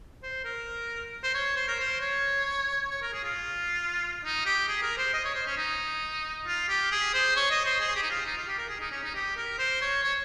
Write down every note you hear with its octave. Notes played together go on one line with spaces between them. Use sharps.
C5
A#4
C5
C#5
C5
A#4
C5
C#5
C#5
A#4
G#4
F4
D#4
G4
G#4
A#4
C5
D#5
C#5
C5
C#4
D#4
F4
G4
G#4
C5
C#5
D#5
C5
G#4
G4
D#4
F4
D#4
F4
G4
A#4
G#4
D#4
C#4
D#4
G4
A#4
C5
C#5
C#5